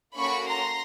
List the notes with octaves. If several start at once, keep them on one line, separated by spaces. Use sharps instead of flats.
A#3 C#4 F#4 A4 B5 C#6
A#5 C6